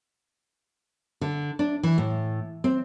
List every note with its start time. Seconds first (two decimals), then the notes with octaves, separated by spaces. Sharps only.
1.21 D3
1.59 D4
1.83 E3
1.98 A2
2.64 C4